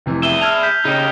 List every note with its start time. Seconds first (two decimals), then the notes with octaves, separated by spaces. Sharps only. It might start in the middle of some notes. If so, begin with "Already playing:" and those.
0.06 F1 C3 E3
0.23 G#4 E5 D#7 G7
0.41 A5 E6 F6 G#6 F7
0.63 G6 B6
0.85 C#3 D#4 G4